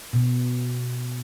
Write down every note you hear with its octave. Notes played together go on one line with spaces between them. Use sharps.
B2